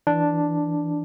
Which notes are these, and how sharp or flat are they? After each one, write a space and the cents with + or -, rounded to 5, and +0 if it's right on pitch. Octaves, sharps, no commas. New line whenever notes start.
E3 +0 D4 +0